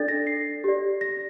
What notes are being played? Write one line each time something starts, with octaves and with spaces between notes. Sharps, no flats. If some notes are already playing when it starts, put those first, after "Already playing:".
Already playing: D4 A4 D5 A6
A#6
C7
G4 D5
A#6